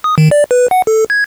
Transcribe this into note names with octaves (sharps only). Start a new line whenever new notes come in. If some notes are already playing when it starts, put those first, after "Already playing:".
D#6
D#3
D5
B4
F#5
A4
G#6